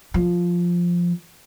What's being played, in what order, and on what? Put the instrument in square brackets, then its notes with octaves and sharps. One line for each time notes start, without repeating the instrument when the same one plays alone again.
[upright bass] F3